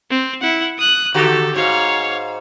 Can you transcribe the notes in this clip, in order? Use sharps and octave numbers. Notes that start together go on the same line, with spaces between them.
C4
E4 F#5
D#6 F#6
D3 F#4 G4 A4
G#2 C#5 F5